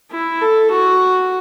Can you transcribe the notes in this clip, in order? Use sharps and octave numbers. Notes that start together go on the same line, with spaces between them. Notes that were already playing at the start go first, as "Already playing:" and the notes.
E4
A4
F#4